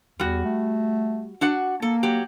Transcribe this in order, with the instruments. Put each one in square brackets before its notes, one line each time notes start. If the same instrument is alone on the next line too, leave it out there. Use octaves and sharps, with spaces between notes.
[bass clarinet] E2 [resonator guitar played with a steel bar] G3 F#4
[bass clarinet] A3
[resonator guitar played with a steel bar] D4 F#4 F#5
[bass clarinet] A#3 [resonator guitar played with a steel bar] A4
[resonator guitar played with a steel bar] F#3 G4